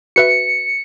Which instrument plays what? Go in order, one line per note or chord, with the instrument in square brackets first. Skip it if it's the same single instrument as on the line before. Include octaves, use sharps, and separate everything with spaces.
[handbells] F#4 B4 E5 [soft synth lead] C#7